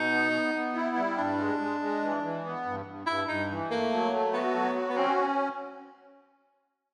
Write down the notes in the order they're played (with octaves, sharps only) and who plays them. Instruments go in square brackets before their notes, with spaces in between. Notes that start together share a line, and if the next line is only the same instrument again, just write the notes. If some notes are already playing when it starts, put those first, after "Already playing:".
Already playing: [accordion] B2 [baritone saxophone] D#4
[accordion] B3
B3
B3
E4
G3
[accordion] G2 [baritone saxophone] D4
[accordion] G#3
G#3
G#3
E3
E3
B3
G2
G2
[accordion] G2 [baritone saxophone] E4
[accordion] G2 [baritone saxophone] D#4
[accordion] E3
[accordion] A3 [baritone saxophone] A#3
[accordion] F#3
A3
[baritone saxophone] B3 [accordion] F#4
[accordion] F#3
F#4
[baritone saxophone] B3
[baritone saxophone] C4 [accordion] C#4